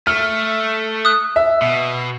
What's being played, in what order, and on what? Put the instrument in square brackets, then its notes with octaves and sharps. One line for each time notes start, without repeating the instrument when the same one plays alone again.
[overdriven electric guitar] A3 [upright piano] F6
[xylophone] D#6 F#6
[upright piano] E5
[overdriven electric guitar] B2